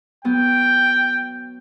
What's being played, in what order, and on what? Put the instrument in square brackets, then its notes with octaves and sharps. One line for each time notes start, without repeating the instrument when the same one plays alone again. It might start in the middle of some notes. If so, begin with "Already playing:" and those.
[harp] F#3 B3 [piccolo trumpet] G5